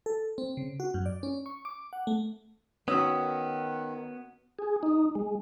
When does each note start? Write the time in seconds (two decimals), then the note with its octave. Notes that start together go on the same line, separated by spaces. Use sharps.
0.06 A4
0.38 C4
0.57 C#3
0.80 F#4
0.94 F#2
1.06 D5
1.23 C#4
1.46 C#6
1.65 D6
1.93 F#5
2.07 A3
2.88 D#3 B3 C#4 F#4 D#6 E6 B6
4.59 G#4
4.83 D#4
5.15 G#3